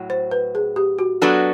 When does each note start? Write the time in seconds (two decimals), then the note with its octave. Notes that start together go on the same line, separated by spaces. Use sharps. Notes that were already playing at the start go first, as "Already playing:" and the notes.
Already playing: A2 F#3
0.10 C5
0.31 B4
0.55 G#4
0.76 G4
0.99 F#4
1.22 F#3 B3 D4 F#4 A4